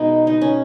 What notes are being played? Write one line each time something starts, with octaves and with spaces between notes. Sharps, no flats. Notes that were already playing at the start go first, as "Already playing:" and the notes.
Already playing: B2 G#3 B3 D#4
D#4
C#4